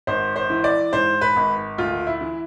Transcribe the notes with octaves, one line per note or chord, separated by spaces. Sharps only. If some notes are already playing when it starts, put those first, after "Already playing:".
G#1 C5
C5
E3
D5
G#2 C5
B4
G#1
D2 F4
E4
E3